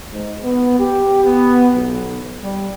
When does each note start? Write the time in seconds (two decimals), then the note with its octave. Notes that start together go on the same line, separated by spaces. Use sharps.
0.12 G#2
0.43 B3
0.79 G4
1.24 B3
1.74 B1
2.42 G3